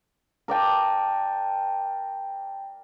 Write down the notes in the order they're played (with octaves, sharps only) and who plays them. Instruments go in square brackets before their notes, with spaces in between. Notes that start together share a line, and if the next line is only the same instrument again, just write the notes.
[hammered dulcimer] A#4 D5 G5 A5